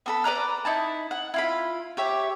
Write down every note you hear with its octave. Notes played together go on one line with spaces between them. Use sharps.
B3 A4 B5
B4 D5 A#5 F#6
D#4 E4 A5
F#5
E4 F4 B5
G4 C#5 E5